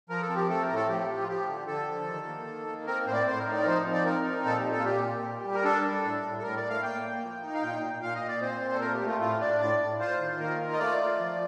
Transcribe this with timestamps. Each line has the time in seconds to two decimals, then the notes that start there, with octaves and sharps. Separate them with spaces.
0.10 F3 A#4
0.22 A4
0.29 C4
0.36 G4
0.48 A3 A4
0.62 A#4
0.69 A2
0.75 A4
0.88 F3 G4
1.08 F3
1.22 F4
1.28 F3 G4
1.48 D3
1.67 D3 A4
1.87 F3
2.07 D#3
2.27 A#3
2.48 D#3
2.67 A#3
2.87 C4 A#4
3.06 A2 C5
3.13 D5
3.26 A2 C5
3.39 A#4
3.46 D#4
3.53 D5
3.62 A#4
3.66 F3 C5
3.85 C4
3.92 D5
4.05 D#4 A#4
4.25 C4
4.45 A#2 A4
4.58 G4
4.64 A#2
4.71 A4
4.79 F4
4.84 A#2 G4
5.05 A#2
5.25 G3
5.44 G3
5.54 A#4
5.64 D4 A4
5.84 D4
6.03 A2
6.23 A2
6.38 A4
6.43 A2 A#4
6.57 D5
6.63 A2
6.70 F5
6.83 A#3 G5
7.03 A#3
7.22 F3
7.42 D#4
7.54 F5
7.62 A#2 G5
7.82 A#2
8.01 A#2 F5
8.15 D#5
8.22 A#2
8.28 D5
8.41 C4 C5
8.61 A#2
8.74 A4
8.81 A3 A#4
8.94 G4
9.01 A3
9.07 F4
9.20 A2 F4
9.40 D4 D5
9.60 A2 D5
9.80 A2
10.00 F4 C5
10.19 D#3
10.39 A#3 A#4
10.59 F4
10.73 D#5
10.79 A3 D5
10.99 F4
11.19 F3